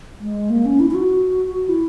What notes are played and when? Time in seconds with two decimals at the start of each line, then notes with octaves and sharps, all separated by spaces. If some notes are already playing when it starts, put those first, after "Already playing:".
0.20 G#3
0.50 A#3
0.65 C#4
0.80 E4
0.91 E4
0.95 F#4
1.69 E4